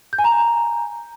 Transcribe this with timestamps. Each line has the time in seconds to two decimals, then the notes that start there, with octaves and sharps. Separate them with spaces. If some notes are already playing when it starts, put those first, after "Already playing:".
0.13 G6
0.19 G#5
0.24 A#5